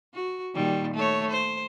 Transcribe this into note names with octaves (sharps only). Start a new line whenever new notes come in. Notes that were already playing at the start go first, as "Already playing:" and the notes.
F#4
A#2 D#3 G3
A3 C#5
C5